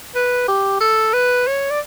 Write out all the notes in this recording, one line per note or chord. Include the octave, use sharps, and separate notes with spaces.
B4
G4
A4
B4
C#5
D5